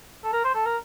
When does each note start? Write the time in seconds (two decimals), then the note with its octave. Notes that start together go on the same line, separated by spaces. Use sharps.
0.24 A4
0.33 A#4
0.44 C5
0.55 A4
0.65 A#4